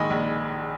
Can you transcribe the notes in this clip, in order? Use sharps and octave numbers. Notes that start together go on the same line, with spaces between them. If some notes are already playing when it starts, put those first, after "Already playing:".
Already playing: A#1 G#2 D#3 D#5 G#5 B5 C#6
A#1